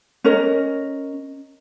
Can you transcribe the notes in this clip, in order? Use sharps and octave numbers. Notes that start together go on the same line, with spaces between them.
C#4 A#4 D#5